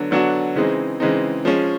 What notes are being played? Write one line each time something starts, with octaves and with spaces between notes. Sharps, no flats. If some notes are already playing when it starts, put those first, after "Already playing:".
Already playing: D3 F#3 B3 D4 F#4
D3 F#3 B3 D4 F#4
C#3 E3 G#3 C4 D#4
C#3 E3 G#3 C4 D#4
F3 G#3 C#4